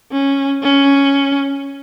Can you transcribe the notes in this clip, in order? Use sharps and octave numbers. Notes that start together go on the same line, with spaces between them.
C#4
C#4